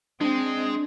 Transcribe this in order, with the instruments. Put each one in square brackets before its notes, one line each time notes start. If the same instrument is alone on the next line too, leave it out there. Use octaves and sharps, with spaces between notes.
[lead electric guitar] G#3 [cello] C4 [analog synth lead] D4